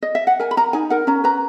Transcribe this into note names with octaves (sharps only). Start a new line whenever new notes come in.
D#5
E5
F#5
A#4 G#5
B5
A#4 A#5
D#4 G#5
A#4 F#5
C#4 A#5
B4 A#5